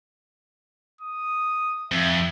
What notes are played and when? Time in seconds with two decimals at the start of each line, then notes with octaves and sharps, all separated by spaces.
1.01 D#6
1.92 F2 E5